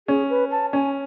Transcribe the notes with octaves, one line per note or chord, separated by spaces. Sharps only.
C#4 G#4
B4
A5
C#4 G#5